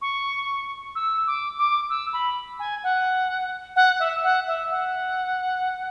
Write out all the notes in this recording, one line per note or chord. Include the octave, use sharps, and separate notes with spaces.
C#6
E6
D6
D6
E6
B5
G#5
F#5
F#5
E5
F#5
E5
F#5